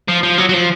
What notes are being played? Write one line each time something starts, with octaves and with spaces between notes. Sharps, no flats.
F3
F3
F#3
F#3
F3